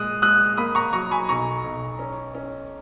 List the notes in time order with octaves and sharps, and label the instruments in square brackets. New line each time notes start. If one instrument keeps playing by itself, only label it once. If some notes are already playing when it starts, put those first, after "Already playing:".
Already playing: [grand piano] A#2 G#3 D#6 F#6
G#3 D#6 F#6
A#3 B5 D#6
A#5 C#6
F#3 A#5 C#6
G#5 B5
B1 A#5 C#6
B1
C#4
C#4